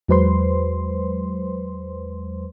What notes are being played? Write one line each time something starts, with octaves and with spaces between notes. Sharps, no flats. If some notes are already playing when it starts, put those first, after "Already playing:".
E2 F#3 G#3 B4 C5 C6